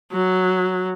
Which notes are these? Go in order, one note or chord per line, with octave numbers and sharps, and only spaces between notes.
F#3